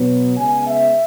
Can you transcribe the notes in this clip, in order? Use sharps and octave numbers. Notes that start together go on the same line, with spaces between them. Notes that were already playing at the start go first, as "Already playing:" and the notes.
Already playing: B2 F#3 B3
C#3 G#3 B3 G#5
E5